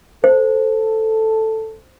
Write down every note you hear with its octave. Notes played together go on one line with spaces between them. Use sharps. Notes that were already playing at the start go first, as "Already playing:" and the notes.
A4 C5